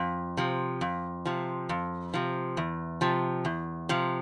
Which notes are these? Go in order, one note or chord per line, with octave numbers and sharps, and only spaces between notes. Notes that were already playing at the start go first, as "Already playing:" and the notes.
Already playing: F2
C3 F3
F2
C3 F3
F2
C3 F3
E2
C3 F3
E2
C3 F3